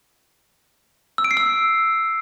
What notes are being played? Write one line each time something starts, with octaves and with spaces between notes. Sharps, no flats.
E6
D7
C7
E6